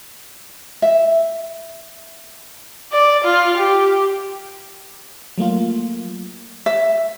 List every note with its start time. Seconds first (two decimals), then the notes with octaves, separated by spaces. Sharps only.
0.82 E5
2.92 D5
3.24 F4
3.57 G4
5.38 F#3 A3 A#3 F4
6.66 E5